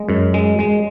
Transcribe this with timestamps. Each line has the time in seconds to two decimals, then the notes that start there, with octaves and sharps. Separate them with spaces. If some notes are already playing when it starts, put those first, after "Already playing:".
Already playing: G#3
0.09 F#2
0.34 G#3
0.59 G#3